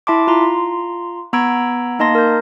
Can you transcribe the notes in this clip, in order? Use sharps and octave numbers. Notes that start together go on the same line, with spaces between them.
E4 E5 A5 C6 D6
F4 A#5 C6
B3 A#5 B5 E6 G#6 D7
A#3 D#4 D#5 A5 C6 A#6
A#4 G6